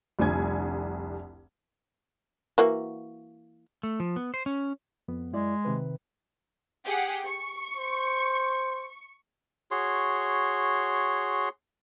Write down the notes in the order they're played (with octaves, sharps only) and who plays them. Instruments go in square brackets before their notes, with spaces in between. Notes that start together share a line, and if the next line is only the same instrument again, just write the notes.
[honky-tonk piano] F1 C2 D3 G#5 G#6
[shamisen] E3 A#3 F#4
[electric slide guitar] A3
F3
B3
C5
C#4
[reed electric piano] F2 B3
[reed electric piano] F#2 E4 D5 [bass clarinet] G#3
[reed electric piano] C3 D#3 B4
[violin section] G4 G#4 F#5
C#6
[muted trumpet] C5
[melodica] F#4 G#4 C#5 C6